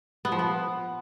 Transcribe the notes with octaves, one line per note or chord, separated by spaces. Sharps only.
B3
F3
B3